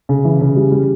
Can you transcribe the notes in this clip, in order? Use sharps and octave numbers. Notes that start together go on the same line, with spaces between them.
C#3
E3
C#3
G3
G3